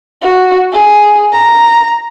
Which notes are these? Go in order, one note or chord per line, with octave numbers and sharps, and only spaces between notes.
F#4
G#4
A#5